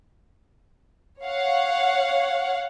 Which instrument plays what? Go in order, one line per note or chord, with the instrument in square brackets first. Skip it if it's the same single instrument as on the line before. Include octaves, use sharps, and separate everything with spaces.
[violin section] C#5 F5 F#5